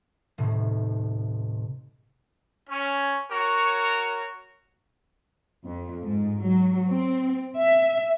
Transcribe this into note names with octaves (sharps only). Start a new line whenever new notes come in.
D#1 A2 C3
C#4
F#4 A#4 C#5
F2
G#2
F#3
C4
E5